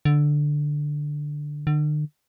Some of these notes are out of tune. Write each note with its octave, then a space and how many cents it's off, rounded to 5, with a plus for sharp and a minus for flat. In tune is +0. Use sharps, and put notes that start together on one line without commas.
D3 +5
D3 +40